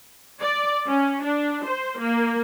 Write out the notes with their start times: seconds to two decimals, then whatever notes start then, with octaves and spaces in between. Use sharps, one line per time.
0.41 D5
0.87 C#4
1.23 D4
1.65 C5
1.99 A#3